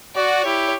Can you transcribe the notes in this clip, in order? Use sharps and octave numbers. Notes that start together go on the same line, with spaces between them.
F#4 D5
E4 G4 C#5